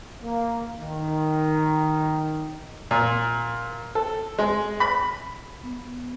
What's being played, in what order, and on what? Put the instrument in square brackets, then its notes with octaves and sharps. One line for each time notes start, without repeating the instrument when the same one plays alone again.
[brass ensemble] A#3
D#3
[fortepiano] A#2
A4
G#3
B5
[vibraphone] B3